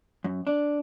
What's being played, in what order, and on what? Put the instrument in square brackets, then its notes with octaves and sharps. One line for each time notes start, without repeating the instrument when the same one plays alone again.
[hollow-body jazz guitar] F#2
D4